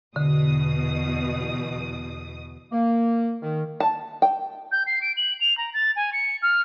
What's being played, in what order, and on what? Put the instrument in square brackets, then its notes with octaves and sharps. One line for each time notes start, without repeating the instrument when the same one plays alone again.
[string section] E2 B2 D#6 [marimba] D3
[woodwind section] A#3
D#3
[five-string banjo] A5
G5
[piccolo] G6
C7
D7
F#7
F7
A#5
A6
G#5
C#7
F6